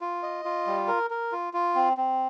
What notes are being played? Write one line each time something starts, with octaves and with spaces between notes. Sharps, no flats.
F4
D#5
F4
G3
A#4
A#4
F4
F4
C4
C4